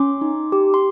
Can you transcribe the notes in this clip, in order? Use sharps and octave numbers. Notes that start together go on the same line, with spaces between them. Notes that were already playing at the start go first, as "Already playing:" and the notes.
Already playing: C#4 C6 D6
D#4
G4
C6